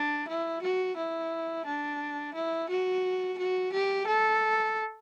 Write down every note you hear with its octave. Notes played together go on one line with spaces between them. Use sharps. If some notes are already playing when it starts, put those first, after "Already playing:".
Already playing: D4
E4
F#4
E4
D4
E4
F#4
F#4
G4
A4